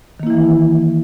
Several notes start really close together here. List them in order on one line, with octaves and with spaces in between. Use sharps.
D#3 A#3 E4 E3